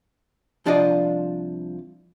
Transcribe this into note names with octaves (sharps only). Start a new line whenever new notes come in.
C2 F3 D4 F4 D5 D#5